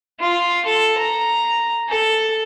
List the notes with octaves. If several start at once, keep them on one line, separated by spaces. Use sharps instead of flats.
F4
A4
A#5
A4